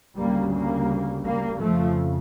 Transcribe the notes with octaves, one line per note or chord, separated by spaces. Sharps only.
D2 C#3 G3 A#3
G3 A#3
G3 A#3
F2 C#3 F3 A3